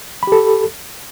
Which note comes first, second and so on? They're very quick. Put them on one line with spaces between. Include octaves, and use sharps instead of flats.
B5 G4 A4